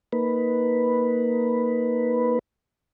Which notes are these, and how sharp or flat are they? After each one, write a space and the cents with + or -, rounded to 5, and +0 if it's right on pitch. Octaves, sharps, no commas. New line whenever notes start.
A#3 +0 D#4 +15 B4 +0